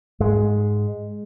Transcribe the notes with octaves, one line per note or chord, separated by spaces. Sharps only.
G#2 G#3